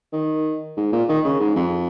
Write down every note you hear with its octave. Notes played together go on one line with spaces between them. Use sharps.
D#3
G#2
A#2
D#3
C#3
G#2
F2